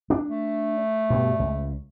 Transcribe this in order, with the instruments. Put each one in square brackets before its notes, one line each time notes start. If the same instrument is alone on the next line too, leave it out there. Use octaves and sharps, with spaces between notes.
[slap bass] D4
[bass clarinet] A3
[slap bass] G2 B2
C#2